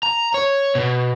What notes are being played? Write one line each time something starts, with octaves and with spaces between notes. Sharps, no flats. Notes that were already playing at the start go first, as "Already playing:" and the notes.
A#5
C#5
B2